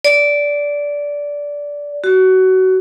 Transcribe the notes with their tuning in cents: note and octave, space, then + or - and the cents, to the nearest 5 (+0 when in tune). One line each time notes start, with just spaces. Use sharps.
D5 -15
F#4 +20